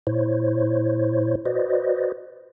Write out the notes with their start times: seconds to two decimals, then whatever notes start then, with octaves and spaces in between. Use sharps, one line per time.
0.07 A#2 E4 C5 C#5
1.45 F#4 B4 C5 D5 D#5